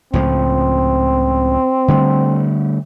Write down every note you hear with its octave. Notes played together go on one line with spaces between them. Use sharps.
C#2 A2 F3 C4
D3 G3 A3